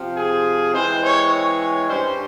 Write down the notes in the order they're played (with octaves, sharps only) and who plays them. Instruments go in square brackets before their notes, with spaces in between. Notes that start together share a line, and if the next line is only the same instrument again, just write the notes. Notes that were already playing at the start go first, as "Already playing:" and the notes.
Already playing: [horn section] C3 F3 C4
G#4
E3 G#3 C4 C5
C#5
C#5
G2 G3 C#4 C5